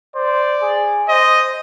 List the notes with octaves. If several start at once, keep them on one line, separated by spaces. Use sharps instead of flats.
C5 D5
G#4
C5 D#5